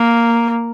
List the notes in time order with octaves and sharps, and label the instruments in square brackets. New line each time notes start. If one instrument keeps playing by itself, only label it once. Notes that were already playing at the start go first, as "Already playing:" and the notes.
Already playing: [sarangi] A#3